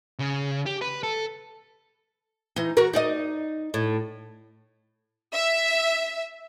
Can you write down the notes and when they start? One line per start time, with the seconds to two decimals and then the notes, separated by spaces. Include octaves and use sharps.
0.19 C#3
0.66 G4
0.81 B4
1.03 A4
2.56 E3 D#4
2.77 F#4 A#4
2.93 D#4 D5 D#5
3.74 A2
5.33 E5